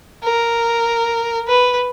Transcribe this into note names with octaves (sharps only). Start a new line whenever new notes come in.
A#4
B4